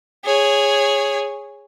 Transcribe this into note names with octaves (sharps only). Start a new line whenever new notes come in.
G#4 C#5